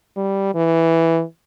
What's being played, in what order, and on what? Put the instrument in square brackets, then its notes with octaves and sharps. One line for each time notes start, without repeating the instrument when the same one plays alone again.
[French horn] G3
E3